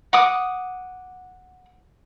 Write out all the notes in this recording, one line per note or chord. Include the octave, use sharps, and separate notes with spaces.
F#5 D6 D#6